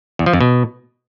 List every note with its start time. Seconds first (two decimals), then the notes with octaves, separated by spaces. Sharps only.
0.19 E2
0.26 F3
0.33 F2
0.41 B2